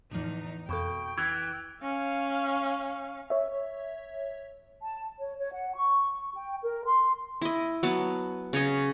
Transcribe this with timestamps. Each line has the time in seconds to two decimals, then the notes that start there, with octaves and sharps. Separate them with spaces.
0.12 E2 A2 D3 F3 D#4
0.69 F2 B2 A4 G5
1.18 E3 G#6
1.82 C#4 F5
3.30 C#5 E5
4.82 A5
5.19 C#5
5.38 C#5
5.53 F#5
5.76 C#6
6.35 G5
6.62 A#4
6.85 C6
7.42 E4 D#5
7.83 F#3 B3 A5
8.53 C#3 C#5 D#5